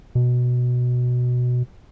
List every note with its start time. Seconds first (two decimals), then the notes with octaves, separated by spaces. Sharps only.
0.15 B2